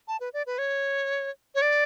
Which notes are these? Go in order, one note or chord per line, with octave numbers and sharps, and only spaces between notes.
A5
B4
D5
B4
C#5
C#5
D5